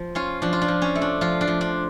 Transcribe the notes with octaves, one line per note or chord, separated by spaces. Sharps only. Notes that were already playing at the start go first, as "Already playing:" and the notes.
Already playing: F3
C#4 F4
F3 D4
F4
D4
F3
C#4
A3
D4
F3 F4
D4
F3
D4